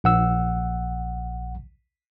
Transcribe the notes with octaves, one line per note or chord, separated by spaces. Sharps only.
A#1 F#5 E6